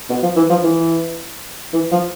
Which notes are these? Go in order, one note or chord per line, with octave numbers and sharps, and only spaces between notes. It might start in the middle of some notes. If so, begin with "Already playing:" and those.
B2
F3
E3
F3
E3
E3
F3